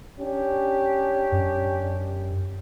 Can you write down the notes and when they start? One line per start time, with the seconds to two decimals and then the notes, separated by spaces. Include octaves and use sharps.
0.19 C#4 D4 G4
1.32 F#2